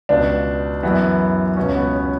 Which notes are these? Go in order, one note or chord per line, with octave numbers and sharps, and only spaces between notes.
C#2 B2 D4
F#2 E3 B3
C#2 B2 C#4
B3
C#4